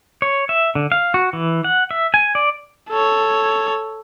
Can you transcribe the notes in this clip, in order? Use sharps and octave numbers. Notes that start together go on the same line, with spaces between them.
C#5
E5
D3
F5
F#4
E3
F#5
E5
G#5
D5
A4 C#5